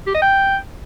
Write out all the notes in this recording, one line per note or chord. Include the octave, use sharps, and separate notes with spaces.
G4
D#5
G5